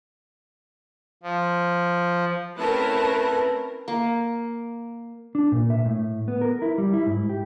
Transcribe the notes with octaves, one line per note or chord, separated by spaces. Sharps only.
F3
A3 C4 C#4 E4 A#4 B4 A5 F#6
A#3
D4
A#2
E5
A2
B3
A#4
E4
G3
E4
G#2
G4